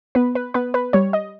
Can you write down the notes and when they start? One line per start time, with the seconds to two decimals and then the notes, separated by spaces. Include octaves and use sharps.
0.15 B3 B4
0.35 B4
0.54 B3 B4
0.74 B4
0.93 G3 C#5
1.13 D#5